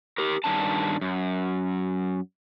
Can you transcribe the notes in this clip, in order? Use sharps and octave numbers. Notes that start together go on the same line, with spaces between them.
G4 A#4
G2 D#3 C#4 D4 A5
F#2